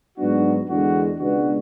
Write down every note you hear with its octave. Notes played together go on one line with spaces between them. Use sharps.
G#2 F#3 B3 D4 F#4
E2 D3 G#3 B3 D4 F#4
C#2 B2 G#3 B3 D4 F#4